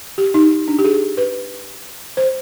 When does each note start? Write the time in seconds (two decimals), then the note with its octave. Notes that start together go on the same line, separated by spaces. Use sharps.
0.18 G4
0.34 D#4
0.68 D4
0.79 G4
0.85 G#4
1.17 B4
2.17 C5